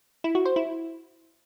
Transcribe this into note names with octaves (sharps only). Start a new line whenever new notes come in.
E4
F#4
C5
E4